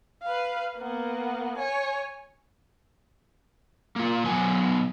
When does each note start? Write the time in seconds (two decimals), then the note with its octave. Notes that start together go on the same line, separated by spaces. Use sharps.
0.23 B4 F5
0.77 A#3 B3
1.57 C#5 G#5
3.96 A#3 F4
4.26 B2 F#3 B3 G#5